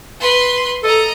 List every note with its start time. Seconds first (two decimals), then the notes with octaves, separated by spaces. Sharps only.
0.20 B4 C6
0.83 A4 D#5 A#5